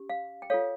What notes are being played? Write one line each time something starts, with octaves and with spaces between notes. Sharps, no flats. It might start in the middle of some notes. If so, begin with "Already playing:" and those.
Already playing: C#4 G4
F5
G5
F4 A4 C#5 F5